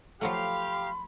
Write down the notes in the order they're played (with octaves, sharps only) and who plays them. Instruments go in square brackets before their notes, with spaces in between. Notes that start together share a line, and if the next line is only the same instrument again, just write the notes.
[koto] F3 F#3 A3 [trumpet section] G4 F5 [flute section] B5 C6